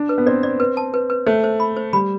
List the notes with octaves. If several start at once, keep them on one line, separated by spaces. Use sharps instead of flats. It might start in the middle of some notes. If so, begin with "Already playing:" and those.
Already playing: D4
B4
B3
C4 D5
D5
B4
A5
B4
B4
A3 C5
C5
B5
C5
G3 B5